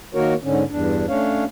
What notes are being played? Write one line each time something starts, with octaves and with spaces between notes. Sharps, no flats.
D#3 A#3 F#4 A#4 C#5
G#2 D3 C#4
E2 G2 D4
A3 C#4 D4 C#5 F5